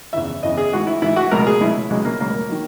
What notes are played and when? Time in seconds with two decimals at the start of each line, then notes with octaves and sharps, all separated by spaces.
0.13 E2 C#3 E3 E5
0.43 E2 C#3 E3 D#5
0.57 G#4
0.72 G#2 E3 F#4
0.87 E4
1.02 G#2 E3 E4
1.16 F#4
1.31 C#2 B2 F#3 A#4
1.46 G#4
1.61 C#2 B2 F#3 E4
1.90 C#2 B2 F#3 G#3
2.05 A#3
2.20 C#2 B2 F#3 A#3
2.49 D#3 F#3